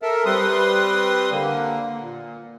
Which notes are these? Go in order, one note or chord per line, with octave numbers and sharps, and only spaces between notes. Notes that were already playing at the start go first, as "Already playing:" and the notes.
A4 A#4 E5
G3 C4 B4 C6 D#6
D3 A#3
A#2